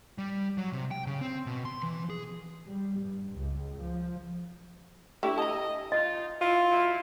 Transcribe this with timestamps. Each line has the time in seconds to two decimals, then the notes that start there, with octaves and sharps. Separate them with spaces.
0.18 G3
0.57 F#3
0.72 C3
0.91 G5
1.06 C#3
1.21 C4
1.46 B2
1.65 C6
1.83 E3
2.10 G#4
2.67 G3
3.00 G2
3.35 C#2
3.82 F3
5.23 A3 D4 E4 G4
5.38 D#5 A5 A#5
5.92 D#4 F4 D#5
6.41 E4 F4
6.70 C#3 F#3 E4